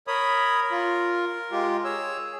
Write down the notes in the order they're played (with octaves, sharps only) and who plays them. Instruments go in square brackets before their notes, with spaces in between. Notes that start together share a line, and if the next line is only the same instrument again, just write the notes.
[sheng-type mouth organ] A#4 [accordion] C#5 B5 D#6
[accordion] F4
G#3 F4 G4
[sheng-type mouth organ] G#4 [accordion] C#5 E6